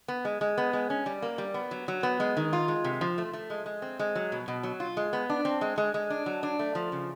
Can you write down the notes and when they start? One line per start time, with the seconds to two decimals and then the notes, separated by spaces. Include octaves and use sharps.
0.08 B3
0.25 G#3
0.41 G#3
0.58 B3
0.73 G#3
0.90 C#4
1.06 G3
1.22 A#3
1.38 G3
1.54 B3
1.71 F#3
1.88 F#3
2.03 B3
2.20 G#3
2.37 D#3
2.53 F4
2.68 G#3
2.84 C3
3.01 F3
3.18 A3
3.33 A3
3.50 G#3
3.66 G#3
3.82 C4
3.99 G#3
4.15 F#3
4.32 B2
4.48 B2
4.63 F#3
4.80 F4
4.97 G#3
5.13 B3
5.30 D4
5.45 C4
5.61 G#3
5.78 G#3
5.94 G#3
6.10 D4
6.26 F#3
6.43 D4
6.59 A3
6.75 F3
6.92 C#3